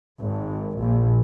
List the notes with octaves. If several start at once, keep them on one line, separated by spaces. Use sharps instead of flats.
G#1
A#1